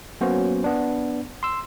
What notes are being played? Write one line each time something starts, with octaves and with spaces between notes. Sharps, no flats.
F#3 A#3 B3 C#4 F#4 C5
B3 D4
C6 E6